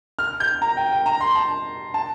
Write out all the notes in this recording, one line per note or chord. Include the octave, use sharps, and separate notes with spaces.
F6
G6
A#5
G5
G5
A#5
C6
A5
A5